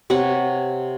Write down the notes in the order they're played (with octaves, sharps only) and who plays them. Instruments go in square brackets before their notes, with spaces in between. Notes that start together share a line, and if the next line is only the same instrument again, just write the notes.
[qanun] C3 B4 C#5 F#5